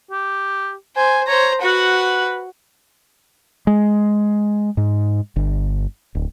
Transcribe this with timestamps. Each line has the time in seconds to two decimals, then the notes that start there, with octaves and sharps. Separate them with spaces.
0.11 G4
0.96 C5 G#5
1.28 C5 C#5 A#5
1.62 F#4 B4 F#5
3.67 G#3
4.77 G#2
5.36 G1
6.15 D1